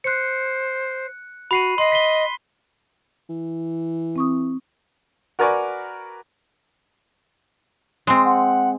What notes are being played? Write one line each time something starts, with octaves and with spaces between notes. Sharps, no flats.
C5 F#6 C#7
F#4 B5 C7 D#7
D#5 C6 C7
B6 C7 G7
E3
C4 C#6 D#6
F#4 A#4 B4 D5 G#5 C#6
G#3 C4
F#5